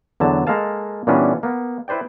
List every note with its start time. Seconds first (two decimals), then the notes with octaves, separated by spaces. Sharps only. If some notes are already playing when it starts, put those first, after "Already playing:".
0.20 E2 D3 F#3 A5
0.47 G#3 A#3 A4 F5 A5
1.07 A#2 E3 G3 B3 C#4 D4
1.43 A#3 B3
1.88 E4 B4 C5 D5 G5